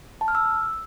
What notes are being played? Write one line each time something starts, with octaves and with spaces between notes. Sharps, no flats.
A5
F6
E6